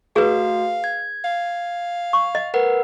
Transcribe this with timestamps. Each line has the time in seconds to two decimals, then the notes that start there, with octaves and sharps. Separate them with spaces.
0.16 A3 F#4 G#4 B4 F5
0.84 G#6
1.24 F5
2.13 C#6
2.35 D#5
2.54 A#4 B4 F#5